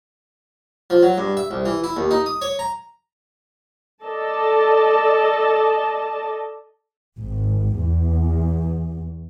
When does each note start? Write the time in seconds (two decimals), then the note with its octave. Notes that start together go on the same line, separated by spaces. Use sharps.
0.90 F3
1.03 F#3
1.18 G2
1.37 E5
1.51 C2
1.65 E3
1.84 E4
1.97 D#2
2.11 D#4
2.26 D#6
2.42 C#5
2.59 A#5
4.03 A4 D5 D#5 A5
7.17 G#1
7.76 E2